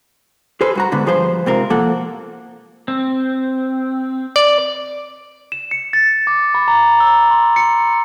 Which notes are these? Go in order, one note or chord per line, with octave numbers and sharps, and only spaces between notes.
G#4 A4 B4 C5
G2 F#4 A#5
G#2 D3 B3
G2 F3 G#4 B4 C5
G#2 C3 C4 F4 A#4
F3 A#3 A4 F#5
C4
D5
E7
C#7
A6
D6
B5
A#5
E6
C6
C#7